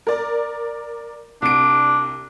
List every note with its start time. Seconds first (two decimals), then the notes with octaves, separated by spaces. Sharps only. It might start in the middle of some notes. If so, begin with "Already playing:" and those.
0.07 A#4 D5
1.42 C2 D4 D7